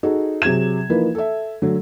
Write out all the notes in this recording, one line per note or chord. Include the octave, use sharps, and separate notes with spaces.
D#4 F#4 G#4 A4
C3 F#3 G#4 G#6 E7
E3 F3 A#3 D#4 B4
A4 E5
D3 F#3 A3